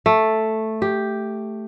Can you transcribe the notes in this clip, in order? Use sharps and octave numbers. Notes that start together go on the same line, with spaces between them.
A3
G4